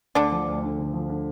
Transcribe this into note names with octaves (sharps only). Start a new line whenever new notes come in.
D2 D3 D4
F3
D2
D3
D3
F3
D3